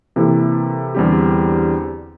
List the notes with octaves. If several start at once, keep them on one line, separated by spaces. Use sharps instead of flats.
C3 E3 A#3 E4 A4
E2 D3 G3 C4 G4